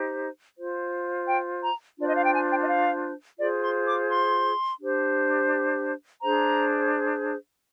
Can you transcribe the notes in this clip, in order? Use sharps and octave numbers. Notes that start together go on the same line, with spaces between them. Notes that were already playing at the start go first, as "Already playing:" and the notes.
Already playing: D#4 G4 C5
F4 C5
G5
A#5
D4 F4 C5 D5
D#5
F5
G5
G#5
G5
D#5
F5
F4 G#4 C5 D5
C6
D6
C6
D4 G4 C5
D4 G#4 C5 A#5